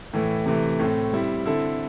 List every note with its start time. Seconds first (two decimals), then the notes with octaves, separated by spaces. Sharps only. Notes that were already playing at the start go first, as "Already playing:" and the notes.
0.13 A2 E3 A3
0.46 C3 E3 A3
0.79 A2 A3 C4
1.13 G3 C4 E4
1.46 D3 C4 E4 A4